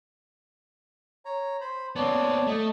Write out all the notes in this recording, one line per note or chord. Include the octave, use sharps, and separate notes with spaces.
C#5 A#5
C5 B5
B3 C4 C#5 D5 A5
A3 D#5